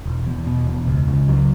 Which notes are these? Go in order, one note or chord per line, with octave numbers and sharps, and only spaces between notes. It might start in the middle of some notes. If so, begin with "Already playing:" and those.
E1
E2
B2
E1
C#2
C#3
F#3